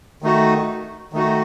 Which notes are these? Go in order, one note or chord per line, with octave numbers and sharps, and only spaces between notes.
D#3 A3 D#4 F#4
D#3 A3 D#4 F#4